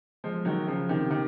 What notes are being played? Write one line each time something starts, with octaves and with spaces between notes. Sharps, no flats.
F3 G#3
D#3 F#3
C#3 F3
C3 D#3
C3 D#3